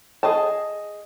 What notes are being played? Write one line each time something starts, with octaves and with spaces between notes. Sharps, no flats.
G#4 D#5 A5